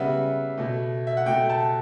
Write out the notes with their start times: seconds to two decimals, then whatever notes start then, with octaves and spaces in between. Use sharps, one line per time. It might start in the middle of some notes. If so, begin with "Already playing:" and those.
Already playing: C#3 G3 B3 E5 F#5
0.58 B2 A3
1.07 E5
1.17 F#5
1.26 B2 A3 G5
1.50 A5